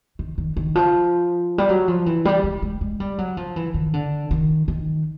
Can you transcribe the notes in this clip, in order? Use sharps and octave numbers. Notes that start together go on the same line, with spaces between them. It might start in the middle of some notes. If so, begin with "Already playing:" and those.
D#3
D#3
D#3
F3
G3
F#3
F3
E3
G3
G#3
G#3
G#3
G3
F#3
F3
E3
D#3
D3
D#3
D#3